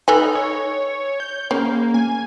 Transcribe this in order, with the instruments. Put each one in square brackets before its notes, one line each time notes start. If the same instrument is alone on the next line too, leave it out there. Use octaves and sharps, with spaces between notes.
[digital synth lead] D#4 [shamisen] A4 B4 G#5
[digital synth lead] C#5
G6
[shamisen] C#3 [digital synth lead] A#3
[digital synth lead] G#5